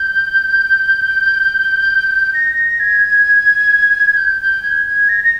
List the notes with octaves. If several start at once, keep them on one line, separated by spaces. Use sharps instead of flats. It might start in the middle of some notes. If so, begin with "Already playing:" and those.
Already playing: G6
A#6
G#6
G6
G6
G#6
G#6
A#6
A#6